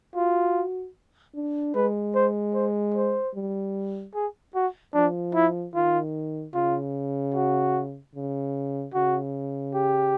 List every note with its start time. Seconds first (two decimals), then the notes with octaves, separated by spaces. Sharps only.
0.15 F4 F#4
1.35 D4
1.75 G#3 B4
2.15 C5
2.55 C5
2.94 C5
3.35 G3
4.15 G#4
4.55 F#4
4.94 F3 D4
5.35 E4
5.74 D#3 F4
6.54 C#3 F4
7.34 F#4
8.15 C#3
8.94 C#3 F#4
9.75 G4